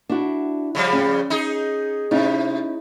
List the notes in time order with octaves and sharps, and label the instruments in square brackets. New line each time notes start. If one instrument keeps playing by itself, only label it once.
[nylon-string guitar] D4 E4 F#4
[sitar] C#3 F3 G3
[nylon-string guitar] C#4
[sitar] D#4 G#4
[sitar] C3 [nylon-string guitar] C#4 D#4 E4